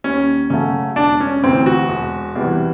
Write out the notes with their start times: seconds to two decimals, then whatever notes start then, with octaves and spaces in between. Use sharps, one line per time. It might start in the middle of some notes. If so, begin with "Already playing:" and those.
0.04 D#2 C#4
0.50 C#3 F#3 A3 C#4
0.96 E1 D4
1.20 C#4
1.43 D2 C3 E3 C4
1.66 F#4
1.89 E1
2.35 E2 C3 E3 G3